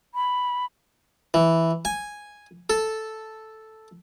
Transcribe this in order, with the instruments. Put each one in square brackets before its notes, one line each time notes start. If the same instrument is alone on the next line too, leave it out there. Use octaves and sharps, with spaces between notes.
[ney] B5
[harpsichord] E3
G#5
A4